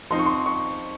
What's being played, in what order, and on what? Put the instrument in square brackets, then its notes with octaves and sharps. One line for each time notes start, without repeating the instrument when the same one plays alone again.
[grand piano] F3 C4 D#4 C6
C#6
C6
C#6